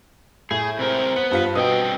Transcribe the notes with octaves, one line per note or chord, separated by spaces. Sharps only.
A2 G#4
C3 A#4 C5
B3 C#7
G2 F4 B6
G2 B2 C4 G5 D#6